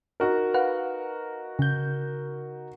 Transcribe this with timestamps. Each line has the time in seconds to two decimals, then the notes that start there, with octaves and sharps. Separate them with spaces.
0.20 D#4 F#4 A#4
0.54 B4 F5 F#5
1.59 C#3 G6